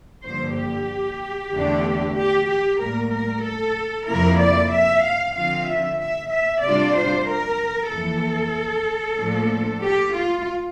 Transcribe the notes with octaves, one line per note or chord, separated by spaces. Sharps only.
G2 D3 F3 A#3 C5
G4
E2 D3 A3 D4
G4
G4
A2 G3 A#3 A#4
A#4
A4
F2 C3 F3 A#3 E4 A#4
D5
E5
F5
D3 F3 C4 F4 F5
E5
E5
E5
C3 G3 D4 F4 D5
C5
A#4
F2 E3 A#3 A4
A2 F3 A#3 D4
G4
F4